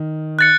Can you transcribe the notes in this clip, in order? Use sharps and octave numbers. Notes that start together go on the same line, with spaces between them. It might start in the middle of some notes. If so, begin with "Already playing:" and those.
Already playing: D#3
F#6 A6 C#7